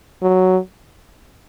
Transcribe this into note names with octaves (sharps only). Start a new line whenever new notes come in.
F#3